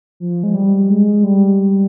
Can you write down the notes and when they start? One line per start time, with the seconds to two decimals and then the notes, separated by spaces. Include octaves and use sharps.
0.20 F3
0.43 G#3
0.54 G3
0.90 G#3
1.24 G3